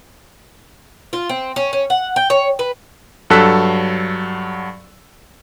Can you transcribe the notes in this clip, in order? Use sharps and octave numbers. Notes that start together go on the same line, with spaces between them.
F4
C4
C#4
C#4
F#5
G5
C#5
B4
G2 F#3 A4 E6 F#6 B6